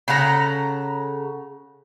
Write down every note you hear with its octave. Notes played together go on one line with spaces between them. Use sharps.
C#3 A4 F#5 A#5